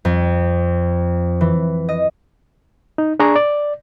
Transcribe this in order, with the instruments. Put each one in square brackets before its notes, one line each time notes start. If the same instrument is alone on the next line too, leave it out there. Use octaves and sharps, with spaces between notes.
[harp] F2
E3
D#5
[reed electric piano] D#4
D4 G#4 D5 A#5 C#6
D5